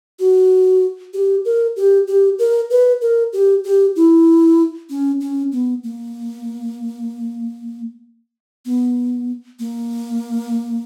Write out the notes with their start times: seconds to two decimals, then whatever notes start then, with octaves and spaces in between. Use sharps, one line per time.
0.19 F#4
1.13 G4
1.45 A#4
1.76 G4
2.07 G4
2.39 A#4
2.70 B4
3.01 A#4
3.33 G4
3.64 G4
3.96 E4
4.90 C#4
5.21 C#4
5.52 B3
5.83 A#3
8.65 B3
9.59 A#3